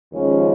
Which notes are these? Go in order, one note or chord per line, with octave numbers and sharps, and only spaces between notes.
D#2 C#3 F3 G#3 C#4